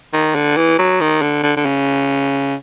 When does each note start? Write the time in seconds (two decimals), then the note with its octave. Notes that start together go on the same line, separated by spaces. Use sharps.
0.13 D#3
0.35 D3
0.56 E3
0.78 F#3
1.00 D#3
1.22 D3
1.43 D3
1.56 D3
1.65 C#3